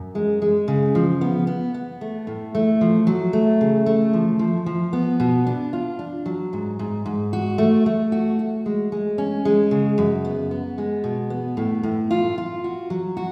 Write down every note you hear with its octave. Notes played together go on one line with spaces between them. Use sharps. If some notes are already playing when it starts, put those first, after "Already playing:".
Already playing: F#2
G#3
G#3
C#3
F3
B3
B3
B3
A3
A2
A3
F3
F#3
A3
C#3
A3
F3
F3
F3
B3
B2
D4
F4
D4
F#3
G#2
G#2
G#2
F#4
A3
A3
F#4
F#4
G#3
G#3
C#4
G#3
C#3
F#2
B3
B3
G#3
B2
B3
A2
A2
F4
F4
F#4
F#3
F#4